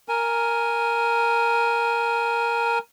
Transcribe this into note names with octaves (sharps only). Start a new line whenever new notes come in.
A#4 G#5